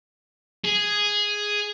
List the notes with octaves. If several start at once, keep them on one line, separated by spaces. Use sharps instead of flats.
G#4